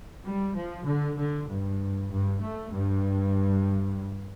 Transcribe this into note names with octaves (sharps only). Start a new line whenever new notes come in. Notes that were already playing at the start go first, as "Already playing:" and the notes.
G3
F3
D3
D3
G2
G2
A3
G2